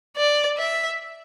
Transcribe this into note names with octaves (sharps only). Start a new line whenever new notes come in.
D5
E5